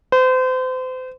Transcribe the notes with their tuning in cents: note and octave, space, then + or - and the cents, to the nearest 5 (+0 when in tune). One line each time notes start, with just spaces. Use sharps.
C5 -35